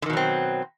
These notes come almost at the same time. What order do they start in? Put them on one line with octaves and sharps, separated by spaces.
D3 D#3 B2 F#3 C4